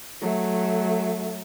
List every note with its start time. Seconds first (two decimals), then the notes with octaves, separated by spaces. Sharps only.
0.21 F#3 A3